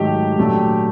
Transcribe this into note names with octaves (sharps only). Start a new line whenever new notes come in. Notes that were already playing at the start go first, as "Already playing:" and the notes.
Already playing: G#2 D#3 F#3 A3 G4
A#2 F#3 A3 D4